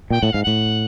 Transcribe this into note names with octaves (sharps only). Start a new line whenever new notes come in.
A#2 G5
A2 F#5
G#2 F5
A2 F#5